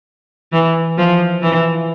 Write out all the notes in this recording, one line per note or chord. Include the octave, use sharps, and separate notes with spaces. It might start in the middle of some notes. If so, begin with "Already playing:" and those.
E3
F3
E3